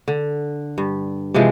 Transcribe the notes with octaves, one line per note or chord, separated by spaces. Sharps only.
D3
G2
C3 E3 F3 G#3